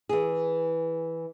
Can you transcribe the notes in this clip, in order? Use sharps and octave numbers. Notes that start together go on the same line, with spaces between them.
E3 G#4